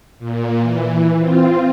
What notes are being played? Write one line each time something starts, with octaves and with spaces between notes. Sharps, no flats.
A#2
E3
C4 F4